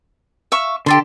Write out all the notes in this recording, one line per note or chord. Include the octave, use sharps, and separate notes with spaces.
E5 F5 C#6
D3 G4 A4 C6